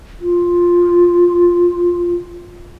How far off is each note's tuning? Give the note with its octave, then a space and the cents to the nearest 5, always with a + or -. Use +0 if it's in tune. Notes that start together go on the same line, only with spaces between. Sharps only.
F4 +5